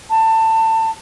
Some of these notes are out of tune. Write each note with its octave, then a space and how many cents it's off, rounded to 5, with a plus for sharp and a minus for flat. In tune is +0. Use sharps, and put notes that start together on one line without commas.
A5 +25